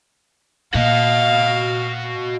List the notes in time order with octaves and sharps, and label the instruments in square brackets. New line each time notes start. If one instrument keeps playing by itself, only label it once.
[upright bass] A#2 [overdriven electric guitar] F#4 D#5 [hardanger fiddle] F5